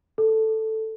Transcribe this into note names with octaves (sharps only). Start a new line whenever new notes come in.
A4